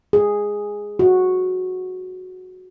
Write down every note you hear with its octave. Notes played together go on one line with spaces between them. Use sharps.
G#4
F#4